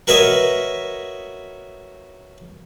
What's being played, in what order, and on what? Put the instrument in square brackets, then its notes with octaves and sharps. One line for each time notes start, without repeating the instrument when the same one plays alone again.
[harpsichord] F#4 A#4 B4 C#5 D#5 E5